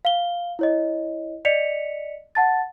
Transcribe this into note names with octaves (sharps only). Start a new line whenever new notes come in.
F5 G7
E4 C#5 D#5
D5 D#5 B6 C#7 F7
F#5 A5 A6